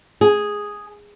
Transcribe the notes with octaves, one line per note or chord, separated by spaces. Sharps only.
G#4